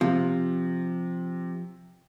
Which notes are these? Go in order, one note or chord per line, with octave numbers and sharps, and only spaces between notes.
C3 F3